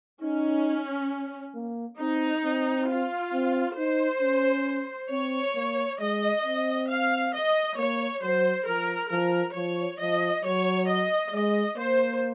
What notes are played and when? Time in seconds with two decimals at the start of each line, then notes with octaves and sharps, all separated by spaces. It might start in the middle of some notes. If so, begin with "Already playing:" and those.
0.22 C#4 D#4
1.55 A#3
1.99 C4 D#4
2.44 C4
2.89 F4
3.33 C4
3.78 D#4 C5
4.22 C#4
5.11 C4 C#5
5.55 A#3
5.99 G#3 D#5
6.44 C4
6.89 F5
7.34 D#5
7.77 A#3 C#5
8.23 F#3 C5
8.66 F3 A#4
9.10 F3 A#4
9.56 F3 C#5
9.99 F3 D#5
10.44 F#3 C#5
10.89 D#5
11.34 G#3 D#5
11.77 A#3 C5